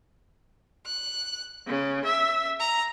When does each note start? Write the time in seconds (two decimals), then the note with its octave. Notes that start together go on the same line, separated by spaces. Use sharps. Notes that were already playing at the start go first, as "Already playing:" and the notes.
0.85 F#6
1.65 C#3
2.04 E5
2.59 A#5